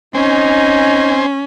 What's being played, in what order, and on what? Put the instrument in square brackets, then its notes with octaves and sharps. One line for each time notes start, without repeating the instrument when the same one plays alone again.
[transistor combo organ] C4 C5 G#5 [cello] C#4 [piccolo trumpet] D#4